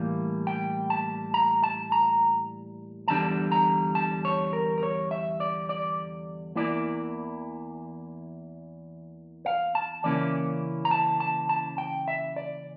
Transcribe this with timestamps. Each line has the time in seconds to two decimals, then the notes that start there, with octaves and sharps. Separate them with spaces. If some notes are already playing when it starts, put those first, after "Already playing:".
Already playing: A2 E3 G3 A#3 F5
0.47 G5
0.90 A5
1.34 A#5
1.63 A5
1.92 A#5
3.08 E2 D3 G3 D4 A5
3.52 A#5
3.95 A5
4.25 C#5
4.53 A#4
4.78 A#4
4.83 C#5
5.11 E5
5.40 D5
5.69 D5
6.56 E2 E3 A#3 E4 D5
9.46 F5
9.75 A5
10.04 C#3 E3 A#3 C#4 E4 D5
10.85 A#5
10.91 A5
11.20 A5
11.49 A5
11.78 G5
12.08 E5
12.36 D5